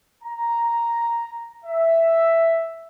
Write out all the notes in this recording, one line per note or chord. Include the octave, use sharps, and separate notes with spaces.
A#5
E5